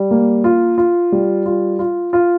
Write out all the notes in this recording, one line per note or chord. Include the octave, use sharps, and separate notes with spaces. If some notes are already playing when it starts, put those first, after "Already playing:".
Already playing: G3
A#3
F4
F4
G3
F4
F4
F4